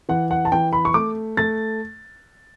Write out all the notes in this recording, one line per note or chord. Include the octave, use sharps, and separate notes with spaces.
E3 F#5
F#5
A5
E3 G5
B5
C#6
A3 D6
A3 A6